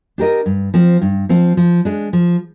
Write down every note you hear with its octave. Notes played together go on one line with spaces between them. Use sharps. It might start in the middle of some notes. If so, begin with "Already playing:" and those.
D4 G4 A#4 D#5
G2
F3 C4
G2
F3 C4
F3
G#3 D4
F3